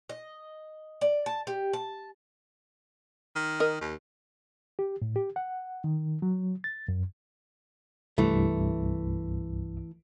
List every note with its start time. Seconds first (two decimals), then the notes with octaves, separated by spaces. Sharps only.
0.09 D#5
1.01 D5
1.26 A5
1.47 G4
1.73 A5
3.36 D#3
3.60 A#4 D#5
3.81 D#2
4.79 G4
5.02 A2
5.16 G4
5.36 F#5
5.84 D#3
6.22 F#3
6.64 A6
6.88 F#2
8.18 C2 G2 E3 A3